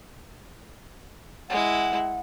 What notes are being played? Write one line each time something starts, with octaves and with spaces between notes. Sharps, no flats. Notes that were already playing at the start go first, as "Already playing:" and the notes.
G#3 E4 F#5